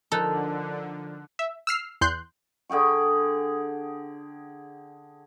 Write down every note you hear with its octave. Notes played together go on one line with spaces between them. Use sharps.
D3 F3 D#4 A4 A#4 F#6
E5
E6 F6 C7
E2 C6 F#6 G6
D3 G#4 G5 C#6